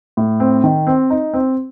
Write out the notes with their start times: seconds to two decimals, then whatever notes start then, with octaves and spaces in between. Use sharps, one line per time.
0.17 A2
0.40 C4
0.64 D#3
0.87 C4
1.10 D#4
1.33 C4